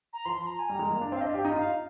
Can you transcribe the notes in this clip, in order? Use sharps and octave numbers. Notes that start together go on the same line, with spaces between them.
A#5
F3 C6
C6
A#5
G#5
G3 A#5
G#3
A#3
D4
C4 F5
D4 D#5
G4 F5
D#4
F4
D#4 F5